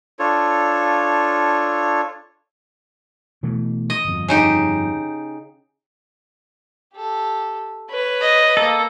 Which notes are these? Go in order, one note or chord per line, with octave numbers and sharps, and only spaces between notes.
D4 F4 A4 C#5
B2 E3 A3
D#5
G1 F2
C#3 D#4 G4
G4 A4
B4 C#5
D#5
A#3 A4 A#5